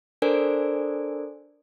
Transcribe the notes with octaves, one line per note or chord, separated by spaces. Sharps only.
D4 A4 A#4 C5 D5 G#5